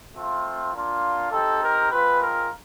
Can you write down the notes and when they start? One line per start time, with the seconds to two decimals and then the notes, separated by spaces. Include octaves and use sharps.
0.15 A3 C4 F4
0.74 A#3 D4 F4
1.32 C4 D#4 G4 A4
1.62 A#4
1.91 G#3 C4 F4 B4
2.21 A#4